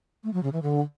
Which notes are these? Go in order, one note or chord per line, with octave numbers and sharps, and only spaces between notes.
A3
F#3
C#3
E3
D3